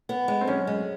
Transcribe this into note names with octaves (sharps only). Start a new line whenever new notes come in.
B3
G#3
C4
F#2 C#4
G#3